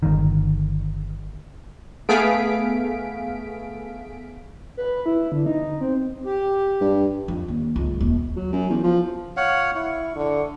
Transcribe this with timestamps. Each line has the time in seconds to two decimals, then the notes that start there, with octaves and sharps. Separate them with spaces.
0.03 G1 D#3
2.09 A3 B3 G#4 F5 B6 D7
4.77 B4
5.06 E4
5.32 D3
5.46 D#4
5.81 C4
6.25 G4
6.81 G2
7.28 F2
7.48 D#2
7.76 C#2 F#2
8.00 D#1 D#3
8.36 F#3
8.53 F#2
8.70 E2
8.83 F3
9.37 C#5 F5 F#5
9.76 E4 C#6
10.16 D3